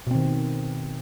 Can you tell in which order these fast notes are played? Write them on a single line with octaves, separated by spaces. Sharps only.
B2 C4 D#3